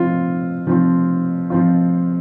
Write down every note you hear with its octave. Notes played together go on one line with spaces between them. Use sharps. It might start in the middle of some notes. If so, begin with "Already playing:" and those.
Already playing: F3 C4 F4
F3 C4 F4
F3 C4 F4